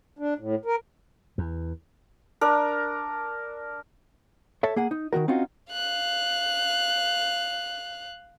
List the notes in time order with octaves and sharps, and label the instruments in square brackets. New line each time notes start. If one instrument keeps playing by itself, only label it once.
[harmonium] D4
A2
A#4
[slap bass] E2
[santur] D4 A#4
[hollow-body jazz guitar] A4 C#5 E5 A5
A#3 G#4 F#5
D#4
D#3 F#3 F#4 A#4
C4 C#4 D#4 F4 F#4
[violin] F5 F#6